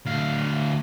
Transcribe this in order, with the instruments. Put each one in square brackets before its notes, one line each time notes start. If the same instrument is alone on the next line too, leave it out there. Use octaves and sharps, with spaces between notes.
[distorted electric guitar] D2 F5